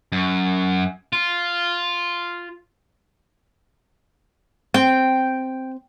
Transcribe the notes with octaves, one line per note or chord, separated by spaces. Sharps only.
F#2
F4
C4 G5